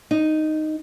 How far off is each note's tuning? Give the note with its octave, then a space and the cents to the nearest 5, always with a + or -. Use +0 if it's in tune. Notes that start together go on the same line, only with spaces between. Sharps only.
D#4 -5